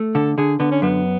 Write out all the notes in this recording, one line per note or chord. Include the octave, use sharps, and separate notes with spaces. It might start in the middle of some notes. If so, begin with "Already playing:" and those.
Already playing: A3
D3 A4
D3 G#4
D3 B3
C#4
F#2 B3